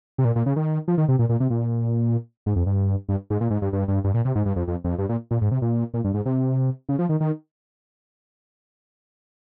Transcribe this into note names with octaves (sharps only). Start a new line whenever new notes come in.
C3
A#2
A#2
C#3
D#3
F3
D#3
C3
A#2
A#2
C3
A#2
G#2
F2
G2
G2
G#2
A#2
G#2
G2
G2
G2
G2
A#2
C3
G#2
G2
F2
F2
F2
G2
A#2
A#2
G#2
C3
A#2
A#2
G2
G#2
C3
C#3
F3
D#3
D#3